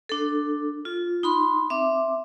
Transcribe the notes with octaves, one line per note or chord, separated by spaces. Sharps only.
D4 A4
F4
D#4 B5 C6
C4 E5 D6